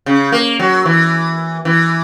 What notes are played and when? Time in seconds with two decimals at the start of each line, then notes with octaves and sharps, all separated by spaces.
0.06 C#3
0.32 A#3
0.59 F#3
0.86 E3
1.65 E3